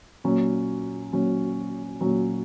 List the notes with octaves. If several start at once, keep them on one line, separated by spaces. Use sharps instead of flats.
A#2 F#3 C#4 F#4
A#2 F#3 C#4 F#4
A#2 F#3 C#4 F#4